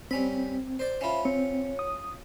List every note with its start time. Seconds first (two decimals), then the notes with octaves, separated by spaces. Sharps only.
0.11 G3 C4 C#4 B5
0.79 C5 D5
1.01 C#4 F4 C5 E5 B5
1.25 C4 C#5
1.79 D#6